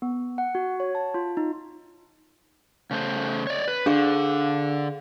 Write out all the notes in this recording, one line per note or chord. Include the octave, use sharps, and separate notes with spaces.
B3
F#5
F#4
C#5
A5
F4
D#4
C#3 A3 C5
C#5 D5
B4
D3 D4 G#4 F5